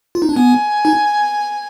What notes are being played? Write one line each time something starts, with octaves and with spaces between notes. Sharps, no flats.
F4
D#4
D4
B3 G#5
D#4